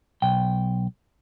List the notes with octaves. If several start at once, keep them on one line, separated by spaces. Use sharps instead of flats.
B1 G5